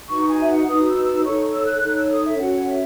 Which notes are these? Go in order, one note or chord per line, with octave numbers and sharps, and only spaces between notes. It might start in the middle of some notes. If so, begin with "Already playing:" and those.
D#4 F#4 B4 C#6
G#5
E5
F#5
D#4 F#4 B4 D#6
E6
E6
D#4 A4 C#5 C#6
E6
F#6
D#4 A4 C#5 F#6
E6
D#6
E5
C#4 F#4 A4 C#5 F#5
E5